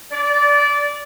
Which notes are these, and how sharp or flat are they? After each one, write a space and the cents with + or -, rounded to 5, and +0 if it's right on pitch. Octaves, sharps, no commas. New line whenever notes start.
D5 -20